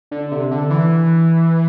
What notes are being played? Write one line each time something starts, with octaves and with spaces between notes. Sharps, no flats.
D3
C3
D3
E3